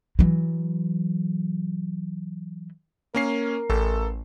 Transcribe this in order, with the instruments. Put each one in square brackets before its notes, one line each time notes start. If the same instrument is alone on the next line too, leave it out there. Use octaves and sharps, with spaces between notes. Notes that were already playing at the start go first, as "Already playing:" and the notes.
[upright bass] E3 F#3
[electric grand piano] A#3 C#4 C7 [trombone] A#4
[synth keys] A1 [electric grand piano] A4